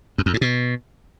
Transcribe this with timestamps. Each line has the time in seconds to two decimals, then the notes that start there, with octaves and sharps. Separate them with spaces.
0.18 F#2
0.26 F2
0.34 G#2
0.41 B2